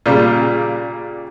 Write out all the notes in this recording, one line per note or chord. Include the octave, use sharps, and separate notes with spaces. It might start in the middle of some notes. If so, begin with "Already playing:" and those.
A#2 C#3 G3